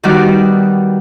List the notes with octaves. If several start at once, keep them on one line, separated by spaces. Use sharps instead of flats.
D#3 G3 B3 D#4 F#4 D5